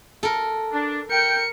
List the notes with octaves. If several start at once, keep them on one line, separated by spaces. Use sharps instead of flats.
A4 A#4
D4
A#4 G5 C#7